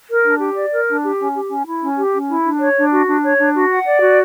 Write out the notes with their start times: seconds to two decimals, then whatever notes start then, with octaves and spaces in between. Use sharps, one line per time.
0.08 A#4
0.24 D4
0.40 G4
0.55 D5
0.72 A#4
0.87 D4
1.03 G4
1.19 C#4
1.34 G4
1.49 C#4
1.66 E4
1.81 C#4
1.98 G4
2.13 C#4
2.29 E4
2.44 D4
2.60 C#5
2.76 D4
2.92 F#4
3.07 D4
3.24 C#5
3.38 D4
3.55 F#4
3.71 F#5
3.86 D5
4.02 F#4